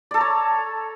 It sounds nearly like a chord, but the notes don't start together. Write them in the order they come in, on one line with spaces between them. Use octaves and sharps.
D5 A4 A#5 C#5